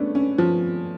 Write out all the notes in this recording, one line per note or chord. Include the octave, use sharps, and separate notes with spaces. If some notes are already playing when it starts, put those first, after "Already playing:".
Already playing: G#3 A3 B3 C#4 D4
C#4
F3